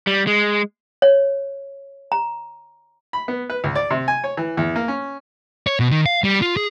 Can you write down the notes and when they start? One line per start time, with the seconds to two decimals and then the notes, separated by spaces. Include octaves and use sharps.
0.07 G3
0.27 G#3
1.02 C#5
2.12 A#5
3.13 B5
3.28 B3
3.50 B4
3.64 C#2
3.75 D5
3.90 C3
4.08 G#5
4.24 C#5
4.37 E3
4.57 E2
4.76 A#3
4.88 C#4
5.67 C#5
5.80 B2
5.92 D#3
6.06 F5
6.24 G3
6.42 F4
6.57 G#4